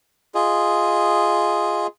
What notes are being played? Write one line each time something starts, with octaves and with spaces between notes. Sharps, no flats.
F4 G#4 D#5